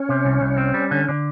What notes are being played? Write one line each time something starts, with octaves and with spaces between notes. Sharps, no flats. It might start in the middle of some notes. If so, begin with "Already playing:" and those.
Already playing: C#4
C3
C2
C2
C4
G3
D3
D3